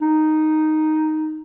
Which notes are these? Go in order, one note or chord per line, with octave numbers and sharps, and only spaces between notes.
D#4